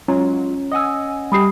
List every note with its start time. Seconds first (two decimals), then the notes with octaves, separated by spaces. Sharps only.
0.08 F#3 G#3 C#4 F4 A#5
0.72 D#5 F#5 G#5 D#6 E6
1.32 G3 G4 B5 D#6 C7